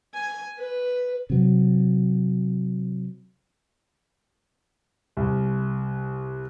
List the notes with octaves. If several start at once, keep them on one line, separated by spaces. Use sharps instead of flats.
G#5
B4
C3 F#3
C2